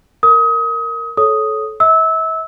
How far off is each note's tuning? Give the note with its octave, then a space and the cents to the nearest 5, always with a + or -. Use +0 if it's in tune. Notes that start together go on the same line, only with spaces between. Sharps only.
A#4 -10 D#6 +30
A4 -25 C#5 +0 D#6 +0
E5 -40 E6 -20